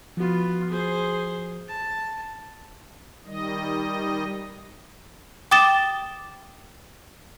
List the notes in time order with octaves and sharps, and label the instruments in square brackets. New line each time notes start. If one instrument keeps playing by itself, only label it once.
[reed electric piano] F3 F#4 [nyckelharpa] B3 F4
[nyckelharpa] G#4 C5
A5
[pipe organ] D#3 G3 D#5
[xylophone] G5 D6 D#6 A6 E7 G7